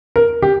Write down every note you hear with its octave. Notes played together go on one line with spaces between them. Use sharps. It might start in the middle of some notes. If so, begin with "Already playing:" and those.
A#4
G4